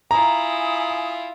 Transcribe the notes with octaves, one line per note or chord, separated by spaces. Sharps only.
E4 F4 G#5 A#5 D#6